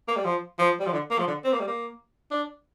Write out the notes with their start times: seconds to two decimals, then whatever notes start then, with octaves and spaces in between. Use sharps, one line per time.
0.08 A#3
0.16 G3
0.25 F3
0.59 F3
0.80 G3
0.86 F3
0.93 D3
1.11 A#3
1.19 F3
1.28 D3
1.44 C4
1.53 A#3
1.60 G3
1.68 A#3
2.31 D4